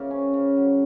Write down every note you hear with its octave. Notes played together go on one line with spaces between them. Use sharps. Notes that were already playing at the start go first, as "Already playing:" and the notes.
Already playing: C#3 A#3 F5
C#4
C#3
F#3